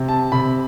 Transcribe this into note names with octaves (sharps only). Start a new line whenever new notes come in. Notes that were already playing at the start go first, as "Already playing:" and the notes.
Already playing: C3
A5
C3 B5